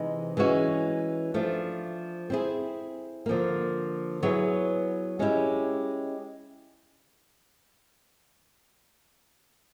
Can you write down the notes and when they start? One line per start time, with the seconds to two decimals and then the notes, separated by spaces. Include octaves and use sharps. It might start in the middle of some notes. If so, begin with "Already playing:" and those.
Already playing: C3 E3 G#3 D#4
0.37 E3 G#3 C#4 F#4
1.34 F3 A3 D4
2.30 C4 E4 G#4
3.26 D3 F3 A#3
4.22 F#3 B3 E4 G#4 C#5
5.19 G#3 C#4 E4 G4